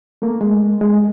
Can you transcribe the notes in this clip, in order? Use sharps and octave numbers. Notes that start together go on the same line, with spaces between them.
A3 A#3
G#3
G#3